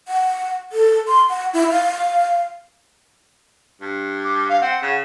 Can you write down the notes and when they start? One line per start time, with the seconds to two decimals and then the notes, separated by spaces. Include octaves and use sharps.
0.08 F#5
0.72 A4
1.08 C6
1.29 F#5
1.53 E4
1.71 F5
3.81 G2
4.24 D6
4.49 F5
4.61 C4 F#5
4.82 C#3